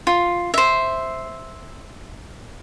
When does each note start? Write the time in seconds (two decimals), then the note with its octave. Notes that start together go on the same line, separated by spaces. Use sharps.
0.07 F4
0.54 C5 E5